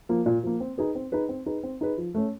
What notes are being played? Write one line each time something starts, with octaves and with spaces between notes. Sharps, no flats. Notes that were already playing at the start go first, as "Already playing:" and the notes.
F3 A#3
A#2
F3 A#3
C4
D#4 G#4 B4
C4
D#4 G#4 B4
C4
D#4 G#4 B4
C4
D#4 G#4 B4
F3
A3 C#4